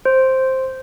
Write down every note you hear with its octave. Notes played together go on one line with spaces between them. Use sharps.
C5